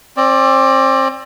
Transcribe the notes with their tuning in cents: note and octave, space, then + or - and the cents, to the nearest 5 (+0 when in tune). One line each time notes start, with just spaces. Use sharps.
C4 +30 D5 +0